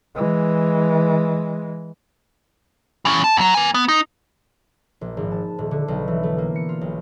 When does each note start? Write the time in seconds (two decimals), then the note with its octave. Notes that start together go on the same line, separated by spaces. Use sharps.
0.15 E3 G#3
3.05 E3 C#4
3.24 A5
3.37 E2 F#3
3.54 A#3 G#5
3.74 B3
3.88 D#4
5.01 A#1
5.17 G#1
5.31 A5
5.58 D#1
5.71 D3
5.88 B1
6.08 E3
6.23 A3
6.38 A#3
6.56 C#7
6.69 F4
6.81 B1